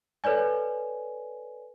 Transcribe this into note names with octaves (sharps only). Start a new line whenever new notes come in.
A4 B4 C#5 D5 G#5